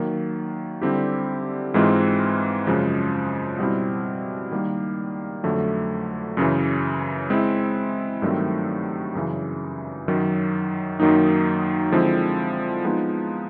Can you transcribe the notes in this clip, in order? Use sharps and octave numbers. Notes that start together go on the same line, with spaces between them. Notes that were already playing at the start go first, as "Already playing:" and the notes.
Already playing: D#3 F#3 A#3
D3 G3 C4 E4 G4
G#2 E3 G#3 C4 F4
F#2 C#3 F3 G#3
B2 G3 C4 E4
D#3 G3 A#3
F2 D3 F#3 A3
F#2 C#3 E3
G#3 C4 E4
G2 D#3 F#3 A3 C4
F#2 C#3 E3
F#2 D#3 F#3
F#2 D#3 F#3 A#3 D#4
D3 F3 G#3 C4 E4
F3 G#3 B3 D#4